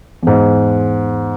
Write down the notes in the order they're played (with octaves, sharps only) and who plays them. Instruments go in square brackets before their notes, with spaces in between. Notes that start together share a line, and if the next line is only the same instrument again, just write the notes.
[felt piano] E2 G#2